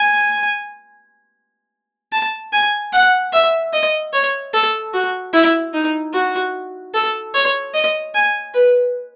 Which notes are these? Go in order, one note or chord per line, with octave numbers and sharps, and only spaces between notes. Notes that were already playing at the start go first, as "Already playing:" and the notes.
Already playing: G#5
A5
G#5
F#5
E5
D#5
C#5
A4
F#4
E4
D#4
F#4
A4
C#5
D#5
G#5
B4